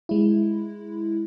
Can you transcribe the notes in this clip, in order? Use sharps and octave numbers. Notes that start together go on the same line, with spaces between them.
G#3 E4